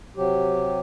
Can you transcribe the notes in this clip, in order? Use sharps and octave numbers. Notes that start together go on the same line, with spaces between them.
C3 F#3 G4